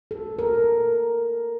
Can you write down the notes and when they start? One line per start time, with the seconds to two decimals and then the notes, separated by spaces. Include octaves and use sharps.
0.11 A4
0.39 A#4